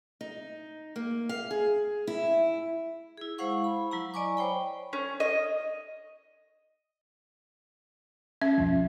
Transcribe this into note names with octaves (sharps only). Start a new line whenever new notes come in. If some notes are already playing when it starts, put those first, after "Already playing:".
D#4
A#3
F5
G#4
E4
E4 G#4
G#3 E4 C5 F5 F#5 C#6
B5
F#3 E4 F#5 A#5
D5 D#5 G#5 C#6 D6
C5 C#5 G5 B5
C#4
D#5
C#4 E5
B1 F2 F3